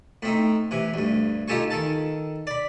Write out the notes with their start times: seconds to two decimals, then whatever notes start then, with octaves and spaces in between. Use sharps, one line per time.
0.23 A2 C4 D#4
0.71 C3 E3
0.94 D2 G2
1.48 D#4 F4 G4 A4 G#5 C#6
1.70 D#3 A4 A5
2.47 D5 B5